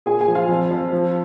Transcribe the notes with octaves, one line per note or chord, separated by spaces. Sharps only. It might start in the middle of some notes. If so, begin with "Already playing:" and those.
A#2 G#4 G#5
G#4 G#5
F3
F4 F5
F2
F2
F3